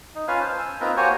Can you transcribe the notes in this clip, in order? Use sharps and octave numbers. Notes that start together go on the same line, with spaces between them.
D#4
C#4 F4 B4 F5 G#5
C5 A5
G#5 E6
A#3 C4 D#4 F4 A#4 B4
A#3 F#4 G4 C5 C#5 G#5